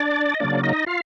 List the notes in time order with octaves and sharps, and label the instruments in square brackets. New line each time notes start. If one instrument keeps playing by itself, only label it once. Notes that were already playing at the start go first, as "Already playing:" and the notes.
Already playing: [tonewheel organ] D4 D5
D#5
C#3 F#3 A#3 D4 D5
D#4 D#5
F4 F5